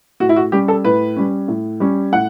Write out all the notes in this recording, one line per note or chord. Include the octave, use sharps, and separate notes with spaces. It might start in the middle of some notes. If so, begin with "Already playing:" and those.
A2 F#4
E4
F#4
G3 C#4 G4
A4
A2 B4
G3 C#4
A2
G3 C#4
A2 F#5